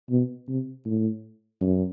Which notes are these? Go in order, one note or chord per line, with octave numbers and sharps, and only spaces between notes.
B2
C3
A2
F#2